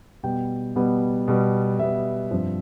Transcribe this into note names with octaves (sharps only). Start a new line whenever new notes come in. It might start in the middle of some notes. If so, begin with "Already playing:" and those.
B2 G3 B3 G5
B2 G3 B3
B2 G3 B3
B2 G3 B3 E5
G2 F3 C4